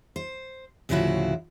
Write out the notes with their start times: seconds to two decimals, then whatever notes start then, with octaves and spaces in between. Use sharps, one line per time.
0.16 C5
0.89 D2 A2 C#3 F3 E4 F#4